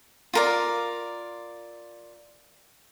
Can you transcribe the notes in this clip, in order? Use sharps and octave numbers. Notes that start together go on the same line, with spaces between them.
F4 A#4 D5